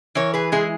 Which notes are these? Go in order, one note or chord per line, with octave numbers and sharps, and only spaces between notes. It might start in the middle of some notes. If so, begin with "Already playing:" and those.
E3 A#4 C#5
G#4 B4
G#3 E4 G#4